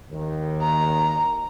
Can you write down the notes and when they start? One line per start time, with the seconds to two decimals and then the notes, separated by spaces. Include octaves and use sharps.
0.12 D#2 D#3
0.61 A#5